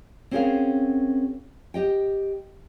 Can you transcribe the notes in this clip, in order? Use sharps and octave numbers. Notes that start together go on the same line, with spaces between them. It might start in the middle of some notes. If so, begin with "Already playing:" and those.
C4 C#4 F#4 G#4 A#4 F5
G4 D#5 G5